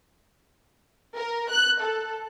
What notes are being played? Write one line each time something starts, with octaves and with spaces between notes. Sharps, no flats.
A#4
F#6
A4